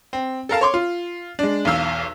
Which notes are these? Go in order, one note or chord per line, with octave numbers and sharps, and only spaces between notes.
C4
A4 A#4 F5 A5
C#5 C6 D6
F4
G#3 D4
B1 E2 F5 E6